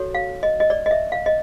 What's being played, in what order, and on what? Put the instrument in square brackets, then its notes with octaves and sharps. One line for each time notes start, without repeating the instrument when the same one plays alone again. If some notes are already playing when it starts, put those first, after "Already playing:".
Already playing: [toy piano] F#4 A4 C#5
F5
D#5
D#5
D5
D#5
E5
F5
D#5